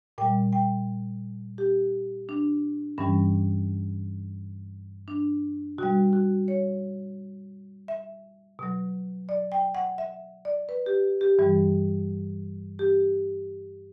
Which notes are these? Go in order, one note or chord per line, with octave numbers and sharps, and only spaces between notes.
A#2 G3 G5
G5
G4
D4
G2 E3 G3 C#4
D4
B2 G3 F#4
F#4
C#5
E5
B2 F#3
D5
G5
F#5
E5
D5
B4
G4
G4
G2 E3 G3
G4